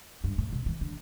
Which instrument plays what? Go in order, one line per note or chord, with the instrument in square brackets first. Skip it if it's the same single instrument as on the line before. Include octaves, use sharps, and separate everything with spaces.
[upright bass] G2
A2
B2
E3
D3